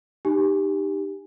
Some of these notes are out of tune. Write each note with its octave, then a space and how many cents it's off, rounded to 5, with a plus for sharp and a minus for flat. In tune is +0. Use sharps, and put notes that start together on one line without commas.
D#4 -25 G4 +0 G#5 +0